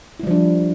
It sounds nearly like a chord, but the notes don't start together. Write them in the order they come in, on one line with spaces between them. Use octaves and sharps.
E4 G3 F3 D4